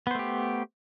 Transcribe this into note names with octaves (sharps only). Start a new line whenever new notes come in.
A3 B3 G4 C5